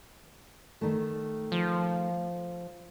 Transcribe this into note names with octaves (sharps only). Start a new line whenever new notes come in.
D#3 A3
F3